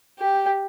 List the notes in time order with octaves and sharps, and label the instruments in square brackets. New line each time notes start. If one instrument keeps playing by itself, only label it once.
[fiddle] G4